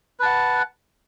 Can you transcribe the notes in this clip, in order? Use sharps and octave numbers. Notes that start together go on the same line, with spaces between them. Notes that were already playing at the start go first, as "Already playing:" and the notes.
B4 F#5 A5